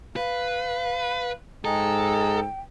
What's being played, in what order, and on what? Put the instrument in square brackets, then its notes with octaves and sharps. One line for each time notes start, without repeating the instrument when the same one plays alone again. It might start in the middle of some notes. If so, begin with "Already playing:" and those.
[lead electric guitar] B4 [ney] F5
[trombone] G#2 [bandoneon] G#3 G#4 A#5 [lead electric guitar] A4 [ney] G5